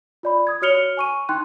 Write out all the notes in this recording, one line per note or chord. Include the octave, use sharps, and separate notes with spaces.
F4 D5 B5
D#6 G#6
F#4 C#5 F6 C#7 F7 G7
G#5 C#6 D#7
D#4 G5 C6 F#6